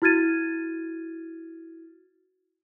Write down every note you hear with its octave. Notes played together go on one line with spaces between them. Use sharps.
E4 F#4 F6 G#6 A6 D#7